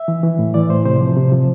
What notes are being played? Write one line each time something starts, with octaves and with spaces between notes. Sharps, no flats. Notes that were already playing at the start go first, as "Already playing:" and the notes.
Already playing: E5
E3
E3
A2
E3 D5
A2 C5
C3 C5
F3
C3
F3